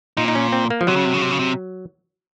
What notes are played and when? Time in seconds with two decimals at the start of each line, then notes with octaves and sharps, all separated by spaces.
0.17 A#2 D#4
0.28 D#4
0.35 C#4
0.52 C4
0.70 A#3
0.81 F3
0.87 C3 F#3
0.96 C#3
1.05 C3
1.14 C#3
1.22 C3
1.31 C#3
1.39 C3